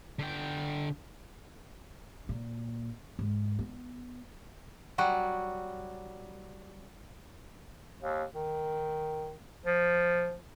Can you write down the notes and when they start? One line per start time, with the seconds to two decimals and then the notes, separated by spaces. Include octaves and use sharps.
0.19 D3 G5
2.29 A#2
3.19 G#2
3.59 B3
4.98 F#3 G3 F#4
8.02 D#2
8.34 D#3
9.66 F3